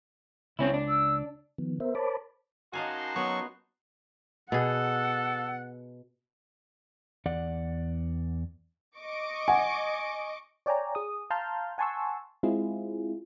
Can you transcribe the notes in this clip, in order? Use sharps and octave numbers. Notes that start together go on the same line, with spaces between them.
C#2 C4 C#4 E4
D4
E6
D#3 F3 B3
B3 A#4 C5 E5
A#4 C5 C#5 A5 B5 D6
F#2 D#4 F#4 D#5 F5 G#5 A5 C6
F#3 B3 C#6
B2 G#4 A4 F#5
E2 D5 F#5
D#5 C#6 D6
F#5 G#5
C#5 D5 G5 G#5 A#5
G#4 D#6
F5 A5 A#5 C6 F6 G6
F#5 G#5 A5 C6 C#6 E6
G#3 C4 E4 F4 G#4